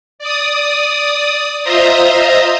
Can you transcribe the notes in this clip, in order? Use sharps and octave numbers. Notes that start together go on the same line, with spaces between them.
D5 D#6
F4 C5 D#5 E5 A#5 D#6